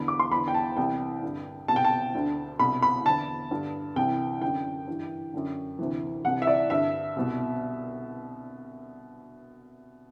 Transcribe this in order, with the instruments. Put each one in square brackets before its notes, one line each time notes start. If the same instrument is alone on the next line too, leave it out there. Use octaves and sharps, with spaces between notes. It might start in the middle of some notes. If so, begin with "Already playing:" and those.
Already playing: [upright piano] E2 D3 B5
D6
C6
E2 D3 B5
G5
A5
C2 C3 E3 G5
G2 D3
C2 B2 A5
G5
A5
D2 D3
C2 B2 B5
B5
E2 D3 A5
G2 D3
C2 C3 E3 G5
F#2 D3 G5
G2 E3
F#2 D3
D2 C3 E3
C2 C3 E3 F#5
E5
D5
G2 D3 E5
C2 B2